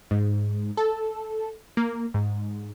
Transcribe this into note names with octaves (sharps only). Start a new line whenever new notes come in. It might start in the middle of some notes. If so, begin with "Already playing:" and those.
G#2
A4
A#3
G#2